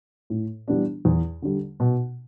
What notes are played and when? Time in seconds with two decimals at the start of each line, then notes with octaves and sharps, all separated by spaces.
0.30 A2
0.68 E3 G3 B3 D4
1.05 E2
1.42 D3 G3
1.80 B2